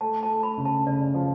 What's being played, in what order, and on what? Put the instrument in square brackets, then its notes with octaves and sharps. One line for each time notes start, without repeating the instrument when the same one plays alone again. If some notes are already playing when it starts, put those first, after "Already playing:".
[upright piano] A3 [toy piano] A5
[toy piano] A5
[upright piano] A3
[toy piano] B5
[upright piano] C#3
[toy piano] A5
[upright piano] C#3 [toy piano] D5
[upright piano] F3